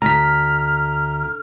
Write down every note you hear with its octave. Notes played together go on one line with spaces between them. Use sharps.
D2 A#5 F6 B6